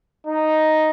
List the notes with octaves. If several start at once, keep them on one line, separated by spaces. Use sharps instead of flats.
D#4